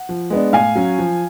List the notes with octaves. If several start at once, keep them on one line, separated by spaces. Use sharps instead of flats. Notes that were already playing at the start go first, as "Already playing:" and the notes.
Already playing: F#5
F3
G#3 B3 D4
A2 F5 G#5
F#3 C#4
F3